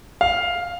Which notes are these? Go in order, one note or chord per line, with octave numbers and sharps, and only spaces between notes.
F5